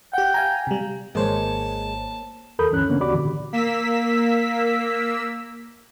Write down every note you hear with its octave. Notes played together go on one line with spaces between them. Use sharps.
G4 F#5 G5
F5 G#5 A#5
C3 G3
G#1 G#3 A#3 C5 C#5 A5
D#2 A4 A#4 B5 D#6 G6
D2 G2 E3 C#4 F#6
C#3 A#3 B3 C#4 D4
D#2 F#4 G4 D5 B5 D6
A#2 D3 E3
A#3 E6 B6